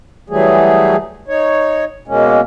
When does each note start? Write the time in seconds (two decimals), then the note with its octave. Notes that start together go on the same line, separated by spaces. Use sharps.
0.30 E3 F#3 G3 A3 G#4
1.28 D#4 C#5
2.08 B2 G#3 A#3 C#4